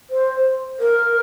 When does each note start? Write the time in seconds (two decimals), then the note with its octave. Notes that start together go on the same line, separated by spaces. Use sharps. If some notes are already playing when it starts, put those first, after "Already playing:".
0.10 C5
0.80 A#4